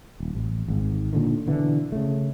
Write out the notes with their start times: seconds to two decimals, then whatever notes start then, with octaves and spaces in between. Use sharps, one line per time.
0.20 D#1
0.35 A1
0.68 G#1 G#2
1.13 A#2 D3 D#3
1.47 B2 D3 E3
1.92 C#3 A3